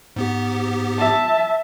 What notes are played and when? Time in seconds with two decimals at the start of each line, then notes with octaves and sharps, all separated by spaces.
0.16 G#2 B3 G4
0.98 E5 A5